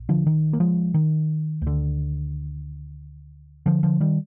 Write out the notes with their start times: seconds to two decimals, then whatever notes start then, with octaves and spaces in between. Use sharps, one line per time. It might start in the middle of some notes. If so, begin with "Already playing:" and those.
Already playing: A#1
0.09 D3 F3
0.27 D#3
0.53 A#3
0.60 F3 G#3
0.94 D#3
1.62 D2
1.67 D3
3.66 D3 F3
3.83 D3 F3
4.00 D#3 G3